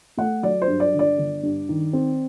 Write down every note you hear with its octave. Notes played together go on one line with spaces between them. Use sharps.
A3 F#5
F#3 D5
C5
G2
D5
D3
D5
G1
G2
D#3
C4